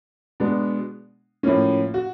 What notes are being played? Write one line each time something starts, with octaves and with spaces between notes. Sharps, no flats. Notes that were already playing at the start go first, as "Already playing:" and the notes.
B2 G#3 B3 D4
A2 F3 A#3 C#4
F#4